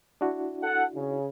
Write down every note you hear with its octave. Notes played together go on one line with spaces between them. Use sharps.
D4 E4 F#4
A4 F#5
C#3